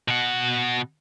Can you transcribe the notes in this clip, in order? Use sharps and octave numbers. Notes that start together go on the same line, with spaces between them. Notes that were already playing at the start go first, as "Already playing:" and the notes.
B2 F#5